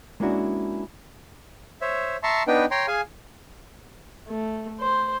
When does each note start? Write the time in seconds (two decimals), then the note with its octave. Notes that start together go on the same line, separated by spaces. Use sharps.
0.20 G#3 A#3 C#4 D4 E4 F#4
1.81 C5 C#5 E5
2.23 E5 A5 A#5 C6 C#6
2.47 B3 D4 D#4 B4 G5
2.71 C#5 G5 A#5 C6
2.88 G#4 F5 G#5
4.27 A3
4.80 C5